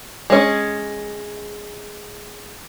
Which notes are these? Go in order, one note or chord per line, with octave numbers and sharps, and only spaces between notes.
G#3 C#4